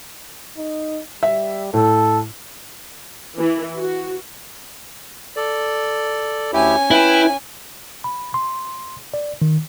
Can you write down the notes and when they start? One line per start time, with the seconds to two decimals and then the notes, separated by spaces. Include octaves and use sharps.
0.58 D#4
1.23 G3 E5
1.74 A2 A4
3.38 E3
3.77 F#4
5.36 A4 D5
6.53 D2 C#4 E4 G4 G#5
6.91 E4 B4 G5
8.04 B5
8.34 C6
9.14 D5
9.42 D#3